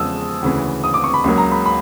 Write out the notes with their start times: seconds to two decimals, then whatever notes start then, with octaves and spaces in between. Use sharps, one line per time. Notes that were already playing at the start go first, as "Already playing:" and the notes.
Already playing: E2 C#3 F3 G#3 D#6 E6
0.42 D2 C#3 E3
0.84 D#6
0.94 D6
1.04 C#6
1.14 B5
1.24 C#2 C#3 F#3 A#3 B5
1.38 A#5
1.52 B5
1.66 B5